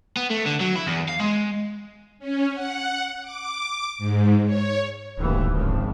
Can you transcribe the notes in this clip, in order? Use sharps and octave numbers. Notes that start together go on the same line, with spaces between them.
B3
A3
D3
F#3
E4
E2
F5
G#3
C#4
F#5
D6
G#2
C#5
D1 G#1 D#2 E3
G#1 C#3 F3